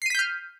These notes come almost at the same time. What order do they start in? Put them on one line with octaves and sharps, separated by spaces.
C7 D#7 B6 G6 F6